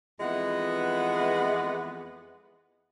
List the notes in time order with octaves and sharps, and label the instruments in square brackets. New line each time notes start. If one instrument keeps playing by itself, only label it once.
[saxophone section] F2 E3 G#3 B3 F#5